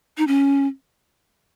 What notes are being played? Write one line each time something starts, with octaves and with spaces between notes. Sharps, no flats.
D#4
C#4